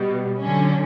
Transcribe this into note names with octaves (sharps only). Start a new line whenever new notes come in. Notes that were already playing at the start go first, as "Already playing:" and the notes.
Already playing: B2 G3 B3
D3 F#3 C#4